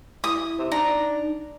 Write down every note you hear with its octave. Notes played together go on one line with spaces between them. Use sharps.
E4 D#6
C3
D4 D#4 A#5